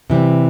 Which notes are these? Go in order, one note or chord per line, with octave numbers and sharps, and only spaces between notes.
C3 E3 G3 C4